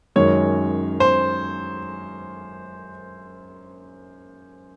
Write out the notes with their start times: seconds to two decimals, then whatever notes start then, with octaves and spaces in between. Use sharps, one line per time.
0.16 F#2 D#3 G#3 C#5
1.00 C5